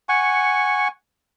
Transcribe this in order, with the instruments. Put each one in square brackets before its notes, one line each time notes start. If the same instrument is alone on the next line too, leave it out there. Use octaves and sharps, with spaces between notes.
[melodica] F#5 G#5 C#6